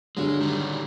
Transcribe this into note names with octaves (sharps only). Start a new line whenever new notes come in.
G2 D3 F#3 G#3
D#3 G3